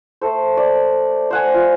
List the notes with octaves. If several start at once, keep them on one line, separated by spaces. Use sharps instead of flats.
A3 A4 C5
D5
C5 F#5 G#5
F4